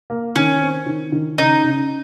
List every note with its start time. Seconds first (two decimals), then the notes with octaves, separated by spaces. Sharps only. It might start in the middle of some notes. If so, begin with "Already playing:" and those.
0.10 A#3
0.36 D#3 C#4
0.61 C4
0.86 D#3
1.12 D#3
1.38 C#3 D#4
1.64 C#3